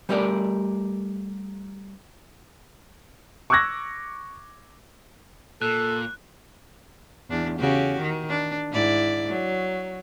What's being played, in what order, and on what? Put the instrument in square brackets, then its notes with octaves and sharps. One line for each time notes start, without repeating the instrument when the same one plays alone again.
[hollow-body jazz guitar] G3 A3 G4 A#4 D5
[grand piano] C#6 D6 E6 F#6 G#6 A#6
[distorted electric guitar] A#2 [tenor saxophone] A4 [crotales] F#6
[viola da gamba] E2 D4
C#3 F#4 G4
D#3
D4
G#2 E4 D5
F#3